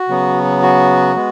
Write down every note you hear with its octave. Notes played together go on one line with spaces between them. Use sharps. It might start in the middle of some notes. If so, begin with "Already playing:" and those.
Already playing: F#4
C#3 F#3 B3
F#4
G#3 B3